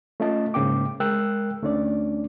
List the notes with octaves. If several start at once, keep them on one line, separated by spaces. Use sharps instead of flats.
A3 C#4 F4 D#5 A5
G#2 C#3 A#3 G5 D6
G#3 A#4 G5 E6 F#6
D2 A3 C#4 D4 D5